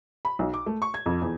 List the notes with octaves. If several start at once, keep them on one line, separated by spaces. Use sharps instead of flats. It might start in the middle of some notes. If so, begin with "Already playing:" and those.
B5
B1
D6
A3
C#6
G#6
F2
E2